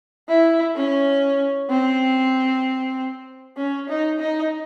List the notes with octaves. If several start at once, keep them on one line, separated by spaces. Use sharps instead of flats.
E4
C#4
C4
C#4
D#4
D#4